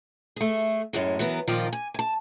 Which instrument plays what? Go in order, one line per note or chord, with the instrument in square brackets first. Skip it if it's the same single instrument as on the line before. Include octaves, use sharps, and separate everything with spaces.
[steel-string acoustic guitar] A3 G#4
F#2 A2 G#3
E3 F#3 B3 A#4
A#2 D#3 F3 A#3 F4 D5
G#5
G#5 A5